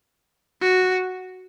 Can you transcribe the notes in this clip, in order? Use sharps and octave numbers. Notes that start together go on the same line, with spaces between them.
F#4